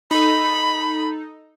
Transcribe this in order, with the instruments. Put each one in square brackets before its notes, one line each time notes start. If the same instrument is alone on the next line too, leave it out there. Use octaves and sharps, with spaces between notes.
[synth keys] D#4 A4 [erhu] B5